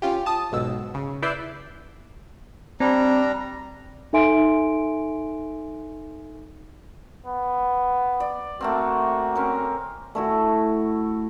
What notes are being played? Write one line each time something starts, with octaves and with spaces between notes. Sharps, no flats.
C#4 F4 G4
A5 D#6
B1 G#2 B2 E6
C#3
E4 B4 D5 E6 G6 C7
G3 C4 D4 A#5
D#4 A4 E5 G#5 C6 D7
B3
D5
A3 A#3 C4 F#4
C4 C#4 A#4
A3 E4 F#4